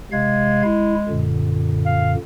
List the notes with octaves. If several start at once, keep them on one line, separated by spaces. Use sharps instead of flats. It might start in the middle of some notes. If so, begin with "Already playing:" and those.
C3 G#3 F5 G#6
E4
F#2 A#2 D3
F5